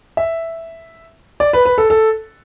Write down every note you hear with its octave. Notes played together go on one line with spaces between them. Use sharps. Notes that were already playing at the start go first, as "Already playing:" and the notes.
E5
D5
B4
B4
A4
A4